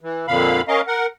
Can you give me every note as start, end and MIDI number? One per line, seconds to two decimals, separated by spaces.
0.01 0.26 52
0.28 0.62 41
0.28 0.62 46
0.28 0.62 50
0.28 0.62 77
0.28 0.62 83
0.68 0.81 61
0.68 0.81 70
0.68 0.81 75
0.68 0.81 77
0.87 1.06 70
0.87 1.06 78